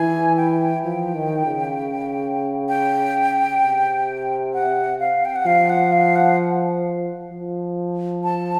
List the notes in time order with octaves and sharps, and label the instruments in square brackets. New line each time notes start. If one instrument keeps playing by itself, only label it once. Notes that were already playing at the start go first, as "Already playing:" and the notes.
Already playing: [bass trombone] E3 [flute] G#5
[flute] G5
[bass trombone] F3 [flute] G5
[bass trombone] D#3
C#3
[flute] G5
[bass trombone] C3
[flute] F#5
F5
G5
F#5
[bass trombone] F3 [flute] F5
[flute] F#5
F5
F#5
[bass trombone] F3
[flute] A5